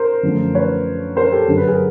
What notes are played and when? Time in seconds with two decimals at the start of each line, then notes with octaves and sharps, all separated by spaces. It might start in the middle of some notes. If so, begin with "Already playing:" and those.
Already playing: A#4 C5
0.23 F#2 D3 F3 A3
0.55 B4 C#5
1.16 A#4 C5
1.32 G4 A4
1.47 G2 D3 F#3 A#4
1.57 B4
1.67 G#4 A#4